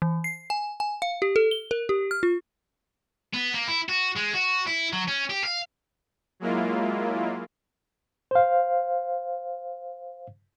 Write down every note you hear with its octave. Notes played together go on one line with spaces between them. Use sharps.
E3
C7
G#5
G#5
F5
G4
A4
G7
A#4
G4
F6
F4
B3
A#3
E4
F#4
G#3
F#4
E4
F#3
C#4
G4
F5
F#3 G#3 A#3 E4 F4
C5 F5